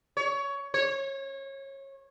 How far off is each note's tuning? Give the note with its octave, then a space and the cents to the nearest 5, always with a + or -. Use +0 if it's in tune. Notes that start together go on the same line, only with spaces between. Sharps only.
C#5 +20
C#5 -25